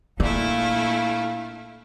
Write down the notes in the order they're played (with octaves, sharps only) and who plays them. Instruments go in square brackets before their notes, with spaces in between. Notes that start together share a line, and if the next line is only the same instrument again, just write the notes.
[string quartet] A#2 A3 E4 [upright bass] D4 [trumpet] F5